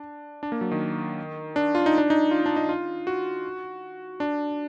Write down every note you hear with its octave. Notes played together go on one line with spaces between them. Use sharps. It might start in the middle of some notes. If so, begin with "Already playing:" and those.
Already playing: D4
D4
A#3
F#3
D#3
D4
F4
D#4
D4
D#4
F4
D4
D#4
F4
F#4
D4